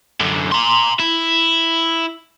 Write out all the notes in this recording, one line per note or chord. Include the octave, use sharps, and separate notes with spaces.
F#2 D3
A#5 C6
E4